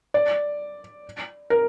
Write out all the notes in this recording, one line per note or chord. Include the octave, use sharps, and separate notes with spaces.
D5
A#4